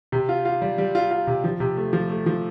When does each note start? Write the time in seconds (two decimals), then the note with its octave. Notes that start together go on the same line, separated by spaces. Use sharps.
0.12 C3
0.29 F4
0.45 F4
0.62 G3
0.78 G3
0.95 F4
1.11 F4
1.27 C3
1.44 F3
1.60 C3
1.77 A3
1.93 F3
2.10 A3
2.26 F3